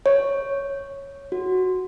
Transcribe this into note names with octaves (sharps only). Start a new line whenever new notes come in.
C#5
F#4